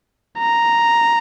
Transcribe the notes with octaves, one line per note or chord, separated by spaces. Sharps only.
A#5